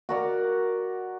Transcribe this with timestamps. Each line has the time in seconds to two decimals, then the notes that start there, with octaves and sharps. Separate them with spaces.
0.09 F#4 A#4 D5